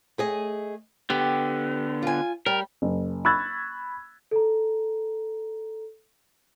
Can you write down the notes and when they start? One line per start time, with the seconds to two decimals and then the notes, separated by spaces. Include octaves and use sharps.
0.18 A3 G#4 D#5
1.10 D3 B3 G4
2.03 F4 G#5
2.46 G3 A#4
2.82 F#1
3.25 B5 C#6 E6 F#6 G#6 A6
4.31 A4 A#5